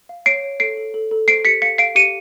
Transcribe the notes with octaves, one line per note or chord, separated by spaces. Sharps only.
F5
C#5 C7 D7
C#5
A4 C7 D7
A4
A4
A4
C5 C7 D7
G4 B6 C#7
F5 B6 C#7
F5 C7 D7
G4 C#7 D#7